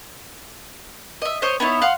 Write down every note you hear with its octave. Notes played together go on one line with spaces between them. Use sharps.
D#5 E5
C5 C#5 D#5
B3 D#4 E4 C#5
F5 F#5 C6